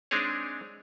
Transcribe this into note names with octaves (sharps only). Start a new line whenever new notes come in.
G#3 C4 D4 D#4 G#4 C#5